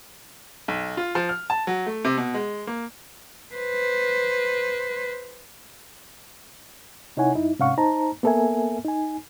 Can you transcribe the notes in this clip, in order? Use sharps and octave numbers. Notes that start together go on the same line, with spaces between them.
B1
F4
F3
F6
A5
F#3
A3
C3
B2
G#3
A#3
B4 C5
C3 D#4 E4 C#5 F#5 G#5
F#2 D#4 E4
G#2 C3 C#4 F5 F#5 C#6
D#4 C5 A5 A#5
A#3 B3 A4 A#4 E5 G#5
D#4 G#5